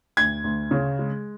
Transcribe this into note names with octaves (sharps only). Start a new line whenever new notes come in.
D2 G#6
D2
C#3
G#3